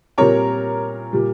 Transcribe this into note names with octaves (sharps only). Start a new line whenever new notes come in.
A#2 G3 C4 A#4 C#5
A#2 G3